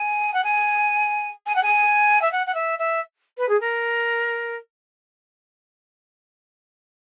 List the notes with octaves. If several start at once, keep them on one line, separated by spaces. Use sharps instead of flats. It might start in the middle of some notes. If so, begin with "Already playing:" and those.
Already playing: G#5
F#5
G#5
G#5
F#5
G#5
E5
F#5
F#5
E5
E5
B4
G#4
A#4